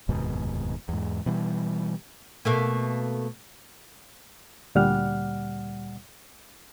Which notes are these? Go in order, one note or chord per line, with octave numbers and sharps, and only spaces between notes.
F1 D#2 G#2 B2
E2 G#2
B2 E3 G3
B2 A3 A#3
D2 A#2 G3 D5 F#5 F6